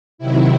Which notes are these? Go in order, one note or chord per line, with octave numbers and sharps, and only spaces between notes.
C3 D#3 F#3 E4